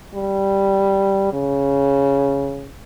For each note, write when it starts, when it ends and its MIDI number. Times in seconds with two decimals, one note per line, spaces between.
0.14 1.30 55
1.33 2.71 49